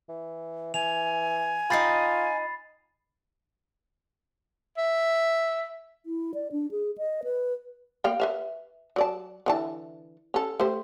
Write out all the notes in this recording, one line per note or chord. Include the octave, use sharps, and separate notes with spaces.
E3
E3 G#5 F7
D#4 F4 D#5 G5 B5 A6 C7
E5
E4
D5
D4
G#4
D#5
B4
A#3 F5 G5
B4 E5 F5
F#3 D5 A5
D3 E3 A5
C#4 A4
A3 G4 C5